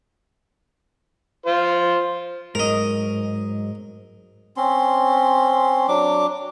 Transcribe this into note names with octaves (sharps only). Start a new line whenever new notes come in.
F4 C5
G#2 F#3 A#4 D#5
C4 C#4 C6
F#3 D4 D6